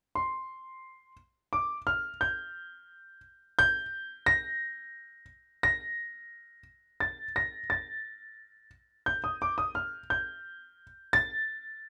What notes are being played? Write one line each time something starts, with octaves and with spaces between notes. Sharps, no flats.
C6
D6
F6
G6
G6
A#6
A#6
A6
A#6
A6
G6
D#6
D6
D#6
F6
G6
A6